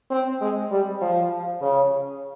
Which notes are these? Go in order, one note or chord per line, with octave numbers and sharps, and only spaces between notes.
C4
G#3
G3
F3
C#3